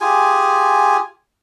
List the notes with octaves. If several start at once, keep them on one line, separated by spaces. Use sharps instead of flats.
F4 G4 G#4 G#5